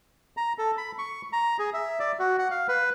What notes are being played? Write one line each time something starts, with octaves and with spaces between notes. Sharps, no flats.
A#5
A4
B5
C#6
A#5
G#4
E5
D5
F#4
F#5
F5
B4